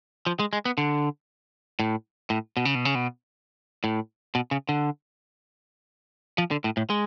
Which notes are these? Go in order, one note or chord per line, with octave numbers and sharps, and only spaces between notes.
F3
G#3
G#3
B3
D3
A2
A2
B2
C#3
B2
C#3
B2
A2
B2
C#3
D3
F3
D3
A2
A2
G#3